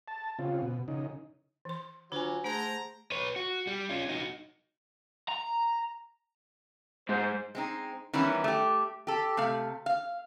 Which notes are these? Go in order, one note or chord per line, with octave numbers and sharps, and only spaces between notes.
A5
C#3 C4 F4
B2
C#3 D#4
E3 C6
D3 F#3 D4 F4 G#5
A3 G#4 C5 F#5 A#5
B4 C#5
F#4
G3
C#4 F4
D#4 F#4
A#5
G#2 C5
G#3 C4 D#4
D#3 E3 G3 B3 C#4 E4
A3 G4
G4 A4
C3 A3 F5
F5